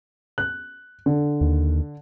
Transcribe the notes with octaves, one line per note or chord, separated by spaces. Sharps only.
F#6
D3
D#2